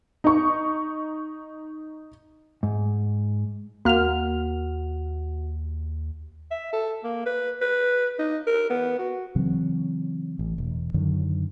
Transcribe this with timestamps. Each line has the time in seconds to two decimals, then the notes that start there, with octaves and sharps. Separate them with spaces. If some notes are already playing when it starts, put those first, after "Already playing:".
0.24 D#4 C#6
2.63 G#2
3.85 D#2 A#3 F#4 F#5 F6 F7
6.51 E5
6.73 A4
7.04 A#3
7.26 B4
7.61 B4
8.19 D#4
8.47 A#4
8.70 B3
8.99 F#4
9.36 C#3 E3 F#3 C4
10.39 A1
10.58 E1
10.94 F#2 D3 D#3 F#3